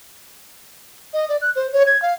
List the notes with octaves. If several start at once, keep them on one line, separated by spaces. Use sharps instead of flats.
D#5
D5
F#6
C5
C#5
G#6
F5